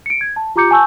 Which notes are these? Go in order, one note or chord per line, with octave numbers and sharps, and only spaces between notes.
C#7 D7
G#6
A5
F4 G4 A#5 D6 G6 C#7
G#5 A5 C#6 E6 G6